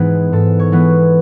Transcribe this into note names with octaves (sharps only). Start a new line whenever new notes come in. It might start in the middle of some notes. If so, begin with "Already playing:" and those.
Already playing: G#2 E3 G#3 B3 G#4
G#2 A4
C#5
E3 G#3 B3